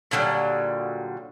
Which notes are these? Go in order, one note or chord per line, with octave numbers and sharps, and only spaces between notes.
A#2 D3 F#3 G3